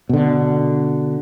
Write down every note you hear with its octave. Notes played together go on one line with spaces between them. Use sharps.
B2 D3